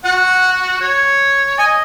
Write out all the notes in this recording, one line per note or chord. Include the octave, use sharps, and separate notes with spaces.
F#4 F#5
C#5
D#5 G#5